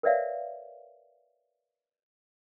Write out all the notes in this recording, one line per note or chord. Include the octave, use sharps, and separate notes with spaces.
A#4 B4 C#5 D5 E5 F5